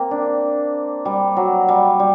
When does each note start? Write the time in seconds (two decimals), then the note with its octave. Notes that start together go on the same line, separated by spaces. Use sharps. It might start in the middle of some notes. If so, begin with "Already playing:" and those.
Already playing: A#3 C4
0.11 D4
1.05 G3
1.37 F#3
1.68 G3
2.00 G3